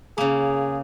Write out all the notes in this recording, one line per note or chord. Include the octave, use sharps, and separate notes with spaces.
C#3 A#3 G#4